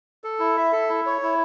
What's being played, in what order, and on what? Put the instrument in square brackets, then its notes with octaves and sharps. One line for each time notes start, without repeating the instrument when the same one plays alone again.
[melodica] A4
E4
E5
A4
E4
C#5
E4